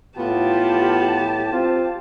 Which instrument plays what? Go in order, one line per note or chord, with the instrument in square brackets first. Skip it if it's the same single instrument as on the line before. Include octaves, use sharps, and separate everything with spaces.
[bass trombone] A2 [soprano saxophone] B3 [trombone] F4 [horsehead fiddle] G4 A5
[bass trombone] C4 [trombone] F4